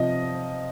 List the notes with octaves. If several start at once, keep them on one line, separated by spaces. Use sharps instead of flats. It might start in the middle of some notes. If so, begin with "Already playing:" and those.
Already playing: C3 F3 D#5